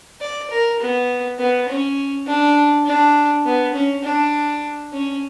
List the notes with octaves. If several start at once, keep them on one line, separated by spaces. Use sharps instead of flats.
D5
A#4
B3
B3
C#4
D4
D4
B3
C#4
D4
C#4